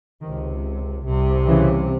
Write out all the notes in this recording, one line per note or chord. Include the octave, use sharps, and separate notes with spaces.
C#2 C3 D#3
C2 C3
C#3 E3